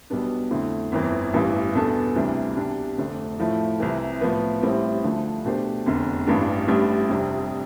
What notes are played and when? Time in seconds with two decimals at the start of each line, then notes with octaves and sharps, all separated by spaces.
0.10 B1 B2 G3 B3 D4
0.51 F2 D3 A3 E4
0.92 G1 F2 E3
1.33 A1 G2 E3
1.75 E2 B2 B3 D4 A4
2.15 D2 C3 E3 G3 D4
2.56 C2 B2 G3 D4 G4
2.98 F1 F2 D3 A3 D4
3.39 A2 F3 A3 E4
3.80 C2 C3 E3
4.21 A2 F3 B3
4.62 A1 A2 G3 C4 E4
5.04 D2 D3 F3 A3 D4
5.45 B2 A3 D4 G4 C5
5.86 F1 E2 D3
6.27 A1 G2 E3 G3 D4
6.68 A1 A2 G3 D4
7.09 F1 F2 C3 G3 D4